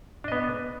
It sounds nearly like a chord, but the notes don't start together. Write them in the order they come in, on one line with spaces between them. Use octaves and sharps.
D4 D#5 B3